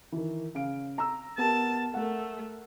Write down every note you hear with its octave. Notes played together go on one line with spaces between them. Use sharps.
D#3 E3
C#3 F5 D7
A#5 E6
B3 G4 A#4 A5
A3 A#4 F#5